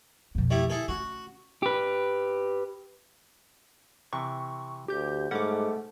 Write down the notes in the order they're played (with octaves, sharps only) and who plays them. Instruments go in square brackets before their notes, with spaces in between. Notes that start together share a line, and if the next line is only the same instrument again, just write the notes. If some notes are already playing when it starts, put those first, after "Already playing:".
[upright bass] F2 B2
[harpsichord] G3 A3 E4
E4 G#4 A4
[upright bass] A3 C#4 [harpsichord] F#4
[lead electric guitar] G4 B4
[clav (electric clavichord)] C3 E3 [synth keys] C#6
[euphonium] D2 [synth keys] G4 G6
[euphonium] G#2 [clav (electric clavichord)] G3 C#4 [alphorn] A3 [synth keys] F#5 D6